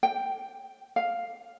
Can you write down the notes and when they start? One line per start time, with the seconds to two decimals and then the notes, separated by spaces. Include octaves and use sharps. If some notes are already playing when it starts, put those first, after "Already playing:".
0.03 G5
0.96 F5